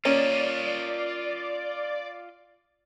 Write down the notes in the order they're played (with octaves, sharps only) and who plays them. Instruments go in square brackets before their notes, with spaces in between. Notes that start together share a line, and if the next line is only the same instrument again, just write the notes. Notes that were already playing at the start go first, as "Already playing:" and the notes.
[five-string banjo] A#3 C#4 [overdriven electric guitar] F4 D#5 [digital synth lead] D5